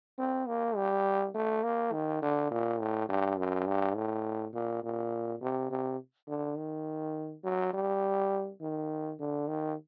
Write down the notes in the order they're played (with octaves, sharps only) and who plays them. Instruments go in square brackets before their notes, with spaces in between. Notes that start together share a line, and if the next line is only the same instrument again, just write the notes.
[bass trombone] C4
A#3
G3
A3
A#3
D#3
D3
A#2
A2
G2
F#2
G2
A2
A#2
A#2
C3
C3
D3
D#3
F#3
G3
D#3
D3
D#3